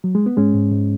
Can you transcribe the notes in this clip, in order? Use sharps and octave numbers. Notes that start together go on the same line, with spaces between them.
F#3
G#3
B3
G#2 G#3 C#4
G#2
G#2